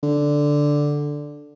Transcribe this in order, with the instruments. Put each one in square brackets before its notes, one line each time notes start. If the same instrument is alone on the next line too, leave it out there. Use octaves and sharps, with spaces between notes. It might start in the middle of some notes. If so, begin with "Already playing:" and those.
[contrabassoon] D3